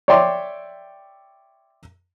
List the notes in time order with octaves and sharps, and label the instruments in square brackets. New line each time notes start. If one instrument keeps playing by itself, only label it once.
[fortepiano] C#5 D5 E5 G5 C6 D6